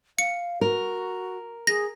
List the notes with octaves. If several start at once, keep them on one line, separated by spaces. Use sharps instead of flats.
F5 C#7
F#4 A#4
G#4 A#6